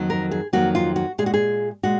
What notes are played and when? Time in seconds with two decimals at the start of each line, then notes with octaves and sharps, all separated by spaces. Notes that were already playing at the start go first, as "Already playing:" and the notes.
Already playing: F2 D#3 F#3 A#3
0.10 A#4
0.31 G#4
0.53 F2 D#3 F#3 A#3 F#4
0.75 F4
0.96 F#4
1.18 A#2 G#3 G#4
1.26 F#4
1.34 G#4
1.83 A#2 G#3 F#4